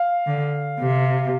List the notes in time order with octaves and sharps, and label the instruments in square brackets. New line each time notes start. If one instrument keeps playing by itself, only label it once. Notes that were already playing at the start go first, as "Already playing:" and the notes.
Already playing: [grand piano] F5
[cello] D3
C3